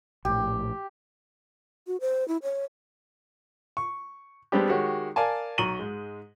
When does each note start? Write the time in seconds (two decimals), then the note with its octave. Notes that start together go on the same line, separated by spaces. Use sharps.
0.25 A#1 A2 G4
1.87 F#4
2.01 C5
2.28 E4
2.43 C#5
3.77 C#6
4.52 G3 G#3 B3 C4 D4 G4
4.69 D#3 G#3 F#4 G4 C#5
5.16 A#4 D5 F5 G#5 A5
5.58 B1 A#5 C#6 D#7 F#7 G7
5.79 G#2 G#3